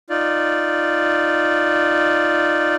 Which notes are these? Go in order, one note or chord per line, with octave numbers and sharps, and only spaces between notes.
D#4 F4 D5